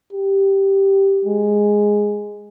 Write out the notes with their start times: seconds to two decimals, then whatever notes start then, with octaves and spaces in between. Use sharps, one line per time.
0.13 G4
1.25 G#3